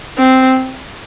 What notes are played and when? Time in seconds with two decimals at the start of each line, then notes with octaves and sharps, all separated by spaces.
0.18 C4